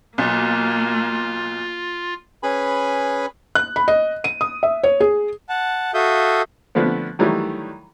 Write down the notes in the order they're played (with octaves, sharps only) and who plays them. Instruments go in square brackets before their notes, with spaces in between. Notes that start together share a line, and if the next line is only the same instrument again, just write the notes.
[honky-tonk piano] B1 [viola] A#3 [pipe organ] F4
[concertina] C#4 G#4 B4 G#5 B5
[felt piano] F#6
B5
D#5
D#7
D#6
E5
C#5
G#4
[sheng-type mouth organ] F#5 A5
F#4 A4 E5 F5 D#6 G6
[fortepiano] D3 F3 A3 B3 C4
D#3 E3 F#3 G3 A3